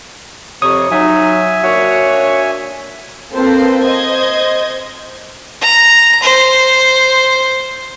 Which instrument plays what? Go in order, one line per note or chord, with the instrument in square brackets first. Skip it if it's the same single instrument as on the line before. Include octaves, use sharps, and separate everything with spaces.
[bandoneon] F2 C3 [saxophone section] C#5 [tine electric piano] D#6
[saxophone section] F#3 [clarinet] D#4 [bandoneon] E5 G#5
[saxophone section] A#3 D4 F#4 [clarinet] C#5
[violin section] A#3 C4 F4 A4 B4 C5
C5 D#5 G#6
[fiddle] A#5
C5